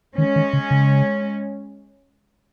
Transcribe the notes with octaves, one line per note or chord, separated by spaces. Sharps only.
D#3 G#3 C#4
D#3
C#3
C#3